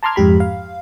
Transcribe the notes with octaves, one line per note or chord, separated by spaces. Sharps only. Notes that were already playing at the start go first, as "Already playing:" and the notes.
A5 A#5 C6 D6 F6 G#6
F2 G#2 G4 B5
F5